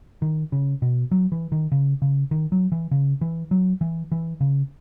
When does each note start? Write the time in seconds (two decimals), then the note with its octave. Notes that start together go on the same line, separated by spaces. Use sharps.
0.22 D#3
0.52 C#3
0.82 B2
1.11 F#3
1.32 E3
1.52 D#3
1.72 C#3
2.02 C#3
2.31 D#3
2.52 F#3
2.72 E3
2.91 C#3
3.21 E3
3.51 F#3
3.81 E3
4.12 E3
4.41 C#3